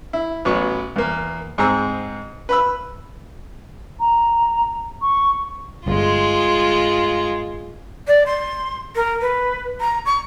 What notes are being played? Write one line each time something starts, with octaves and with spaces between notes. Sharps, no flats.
E4
A1 F#3 B3 C#6
E2 A#3
G#2 C4 G#4 A#5 E6
B4 B5 E6
A#5
C#6
G1 G#3 F4
D5
C6
A#4
B4
A#5
C#6